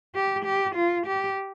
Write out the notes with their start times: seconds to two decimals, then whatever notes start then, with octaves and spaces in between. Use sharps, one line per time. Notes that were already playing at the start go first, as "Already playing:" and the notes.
0.15 G4
0.45 G4
0.76 F4
1.07 G4